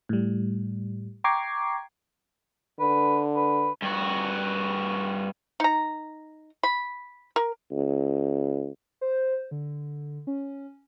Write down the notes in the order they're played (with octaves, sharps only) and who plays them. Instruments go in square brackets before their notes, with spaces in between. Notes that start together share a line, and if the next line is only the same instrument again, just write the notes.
[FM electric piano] A2 G3
G5 A#5 C#6 D6 G#6 C7
[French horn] D3 [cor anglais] B4
[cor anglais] B4
[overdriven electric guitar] G2 F#4
[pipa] D#4 A#5
B5
A#4
[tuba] C#2
[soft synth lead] C5
D3
C#4